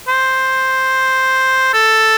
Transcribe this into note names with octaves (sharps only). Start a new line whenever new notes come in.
C5
A4